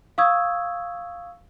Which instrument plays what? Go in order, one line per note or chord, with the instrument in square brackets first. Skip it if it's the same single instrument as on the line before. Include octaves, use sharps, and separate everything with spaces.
[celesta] F5 C#6 D#6 E6 G#6